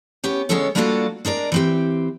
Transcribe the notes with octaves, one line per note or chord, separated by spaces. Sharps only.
B3 C#4 G4
D3 G#3 B3 C#4 A4 C#5
G3 A#3 D4 F4 F#4 A4
G#3 D4 A#4 D5
E3 C4 G4